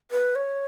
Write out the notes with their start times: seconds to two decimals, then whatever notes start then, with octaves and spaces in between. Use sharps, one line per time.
0.11 B4
0.35 C#5